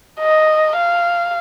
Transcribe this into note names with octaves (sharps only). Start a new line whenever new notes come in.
D#5
F5